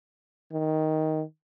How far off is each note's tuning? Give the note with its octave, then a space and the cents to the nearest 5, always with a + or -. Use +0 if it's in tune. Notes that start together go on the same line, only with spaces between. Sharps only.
D#3 +10